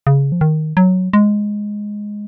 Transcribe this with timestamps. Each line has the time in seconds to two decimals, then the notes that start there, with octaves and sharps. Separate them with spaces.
0.07 C#3
0.32 F3
0.41 D#3
0.77 F#3
1.13 G#3